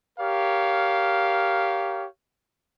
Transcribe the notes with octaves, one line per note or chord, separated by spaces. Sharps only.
G4 A#4 C#5 F5